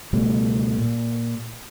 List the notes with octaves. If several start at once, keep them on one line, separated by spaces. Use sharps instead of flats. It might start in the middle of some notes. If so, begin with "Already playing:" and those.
C#2 B2 G3 A3
A#2